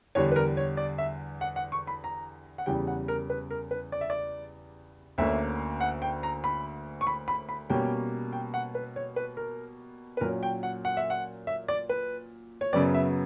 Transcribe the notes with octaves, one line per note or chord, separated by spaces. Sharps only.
E2 D3 G3 C#5
B4
A#4
C#5
D5
E5
F#5
F#5
C#6
B5
A#5
F#5
E2 C#3 G3 G5
F#5
A#4
B4
A#4
B4
D5
E5
D5
D2 D3 A#3 C#4 E5
F#5
G5
A#5
B5
C#6
B5
B5
B5
B2 G3 A#3 C#4 G5
G5
F#5
B4
C#5
B4
A#4
B4
A#2 F#3 C#4 A#4
G5
F#5
F#5
E5
F#5
E5
D5
B4
C#5
F#2 C#3 F#3 B3 D5
E5